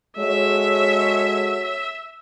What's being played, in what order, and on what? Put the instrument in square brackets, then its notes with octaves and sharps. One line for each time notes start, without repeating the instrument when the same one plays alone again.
[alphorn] G#3 [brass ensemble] F#4 A4 C#5 [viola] E5